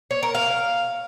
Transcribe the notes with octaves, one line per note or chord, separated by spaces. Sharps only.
C#5
A#4
F5